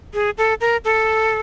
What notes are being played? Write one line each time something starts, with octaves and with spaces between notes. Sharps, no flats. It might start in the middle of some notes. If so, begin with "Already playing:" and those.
G#4
A4
A#4
A4